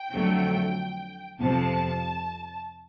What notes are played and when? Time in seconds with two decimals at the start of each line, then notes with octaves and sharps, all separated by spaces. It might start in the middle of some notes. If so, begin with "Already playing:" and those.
Already playing: G5
0.12 F2 D3 F#3 A3
1.40 F2 C3 F3 A5